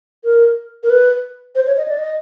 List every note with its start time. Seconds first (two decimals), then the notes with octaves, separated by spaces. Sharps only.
0.24 A#4
0.83 A#4
0.90 B4
1.55 C5
1.67 C#5
1.77 D#5
1.88 D5
1.98 D#5